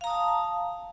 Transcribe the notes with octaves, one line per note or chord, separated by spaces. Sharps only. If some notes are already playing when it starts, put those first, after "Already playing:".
F5 A5 A#5 D#6